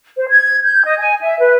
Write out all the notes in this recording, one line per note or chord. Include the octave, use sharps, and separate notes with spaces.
C5
G#6
G6
D#5
G#5
E5
B4